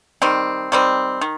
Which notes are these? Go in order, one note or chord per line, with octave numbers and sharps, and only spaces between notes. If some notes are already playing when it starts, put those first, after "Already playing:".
D#3 G3 C4
D#3 G3 C4
D#3